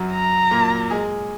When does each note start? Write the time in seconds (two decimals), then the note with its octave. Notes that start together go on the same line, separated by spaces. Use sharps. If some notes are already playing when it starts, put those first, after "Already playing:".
Already playing: F#2 F#3
0.12 A#5
0.51 A#2 A#3
0.90 G#3 G#4